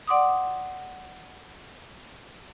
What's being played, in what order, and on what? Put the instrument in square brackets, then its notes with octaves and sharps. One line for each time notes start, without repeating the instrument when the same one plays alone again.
[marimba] D5 F#5 C6 D6 D#6